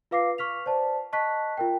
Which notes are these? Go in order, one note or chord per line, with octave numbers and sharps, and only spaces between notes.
F4 B4 F5 D6 A#6 C7
C#6 F6 B6 F7
C5 D5 A5
D#5 A5 C#6 F#6 B6
F4 A#4 G5